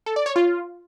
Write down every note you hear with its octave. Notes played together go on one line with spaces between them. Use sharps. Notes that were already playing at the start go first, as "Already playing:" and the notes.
A4
D5
C#5
F4